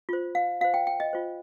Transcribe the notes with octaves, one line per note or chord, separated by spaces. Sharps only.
F4 C5
F5
F4 C5 F5
G5
G5
D#5
F4 C5